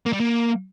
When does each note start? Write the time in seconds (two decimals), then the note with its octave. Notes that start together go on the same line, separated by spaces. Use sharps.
0.06 A#3
0.13 G3
0.20 A#3